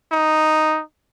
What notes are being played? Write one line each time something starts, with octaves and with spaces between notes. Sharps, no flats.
D#4